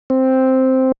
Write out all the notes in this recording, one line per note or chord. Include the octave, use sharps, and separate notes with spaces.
C4